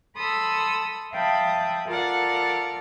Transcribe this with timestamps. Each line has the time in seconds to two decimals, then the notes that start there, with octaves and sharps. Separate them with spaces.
0.15 A4 B5 C6 D#6 E6
1.11 E5 F5 G5 A5 B5 D#6
1.86 F4 A4 A#4 D5 F5 F#5